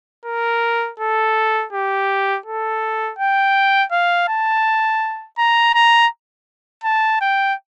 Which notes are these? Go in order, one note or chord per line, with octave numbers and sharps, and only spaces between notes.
A#4
A4
G4
A4
G5
F5
A5
A#5
A#5
A5
G5